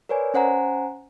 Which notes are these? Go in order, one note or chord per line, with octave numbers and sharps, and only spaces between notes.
A#4 B4 C#5 D5 G#5
C#4 C5 F#5 G#5 A#5